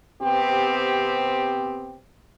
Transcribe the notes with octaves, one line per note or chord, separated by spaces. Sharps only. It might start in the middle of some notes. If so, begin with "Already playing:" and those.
C3 B3 C4 G4